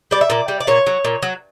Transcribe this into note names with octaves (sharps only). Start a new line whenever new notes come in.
G3 D5
E5
A#2 D5
G3
D5
A#2 C#5
F#3
A#2
F#3